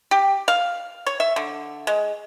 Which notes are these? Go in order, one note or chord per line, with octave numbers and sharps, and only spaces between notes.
G4
F5
C#5
E5
D3
G#3